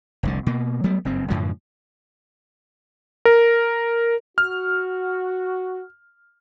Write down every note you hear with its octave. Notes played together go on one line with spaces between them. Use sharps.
F1 C2 D3
B2 A#3
F#3 G3 A3 B3
F#1 G2 C4
F#2 A2 D3 F3
A#4
F#4 F6